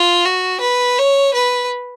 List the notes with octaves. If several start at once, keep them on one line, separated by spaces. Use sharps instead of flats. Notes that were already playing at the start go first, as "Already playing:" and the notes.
Already playing: F4
F#4
B4
C#5
B4